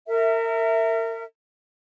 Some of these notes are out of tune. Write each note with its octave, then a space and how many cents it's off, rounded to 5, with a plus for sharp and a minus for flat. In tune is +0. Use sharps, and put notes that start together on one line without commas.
A#4 -30 E5 +0